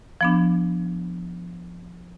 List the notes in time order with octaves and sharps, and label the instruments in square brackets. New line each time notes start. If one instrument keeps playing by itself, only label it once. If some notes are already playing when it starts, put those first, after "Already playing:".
[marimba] F3 B3 D4